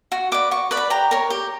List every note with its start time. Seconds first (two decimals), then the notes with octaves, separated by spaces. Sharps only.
0.12 F#4 C#6
0.32 B4 D5 D6
0.51 F#4 C#6
0.71 B4 D5
0.77 B5
0.90 G4 A#5
1.11 A#4 C#5
1.30 G4